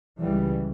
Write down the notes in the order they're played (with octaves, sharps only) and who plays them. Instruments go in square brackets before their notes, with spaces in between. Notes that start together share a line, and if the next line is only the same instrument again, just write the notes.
[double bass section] C#2 C#3 E3 G3